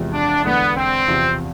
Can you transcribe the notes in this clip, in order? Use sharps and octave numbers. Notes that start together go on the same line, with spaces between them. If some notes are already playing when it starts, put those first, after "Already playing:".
Already playing: E2 C3 F3 G#3
D4
E2 D3 G#3 B3 D4
C4
E2 C3 F3